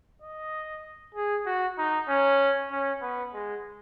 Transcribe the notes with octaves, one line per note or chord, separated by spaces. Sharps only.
D#5
G#4
F#4
D#4
C#4
C#4
B3
G#3